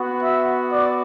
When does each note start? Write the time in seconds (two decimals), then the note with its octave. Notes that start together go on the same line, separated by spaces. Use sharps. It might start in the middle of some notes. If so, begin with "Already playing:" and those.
Already playing: B3 F#4
0.22 E5
0.72 D5